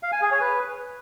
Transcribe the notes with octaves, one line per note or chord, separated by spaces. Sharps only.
F5
G#5
G#4
C#5
B4